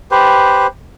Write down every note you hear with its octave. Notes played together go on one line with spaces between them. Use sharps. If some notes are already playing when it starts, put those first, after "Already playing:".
G4 B4 C5